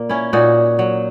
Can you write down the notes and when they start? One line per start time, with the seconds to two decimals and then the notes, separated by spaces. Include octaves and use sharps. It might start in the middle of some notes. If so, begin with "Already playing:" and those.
Already playing: A#2 A#3
0.09 C#4 E4
0.33 A#2 D#4 F#4
0.79 F#3